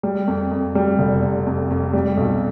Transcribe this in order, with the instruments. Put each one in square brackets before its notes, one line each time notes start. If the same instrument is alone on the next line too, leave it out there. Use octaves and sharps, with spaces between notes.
[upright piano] G3
F2
F2
G3
F1
C3
F2
F2
G3
B1